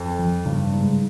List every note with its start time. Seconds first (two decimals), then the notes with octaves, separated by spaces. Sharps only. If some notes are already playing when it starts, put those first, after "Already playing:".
Already playing: F2
0.19 F3
0.45 G2 C#3
0.72 G#2 G3